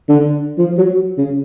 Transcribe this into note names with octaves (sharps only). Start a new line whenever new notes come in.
D3
F3
F#3
C#3